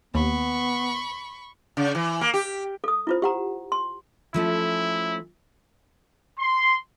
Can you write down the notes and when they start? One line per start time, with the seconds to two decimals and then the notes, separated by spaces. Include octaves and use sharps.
0.14 D#2 B3 B5 C#6
1.77 C#3
1.95 E3
2.21 A#3
2.34 G4
2.84 A4 D#6
3.07 E4 F4 C5
3.22 G4 F#5 A#5
3.72 C6
4.34 F3 A3 C#4 E4
6.38 C6